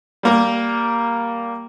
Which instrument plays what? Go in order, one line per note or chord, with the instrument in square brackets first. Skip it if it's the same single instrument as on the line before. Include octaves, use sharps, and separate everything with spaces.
[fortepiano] G3 A#3 A#4